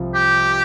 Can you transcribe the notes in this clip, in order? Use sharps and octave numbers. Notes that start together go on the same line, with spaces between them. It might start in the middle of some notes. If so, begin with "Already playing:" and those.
Already playing: C2 C3 F3
G4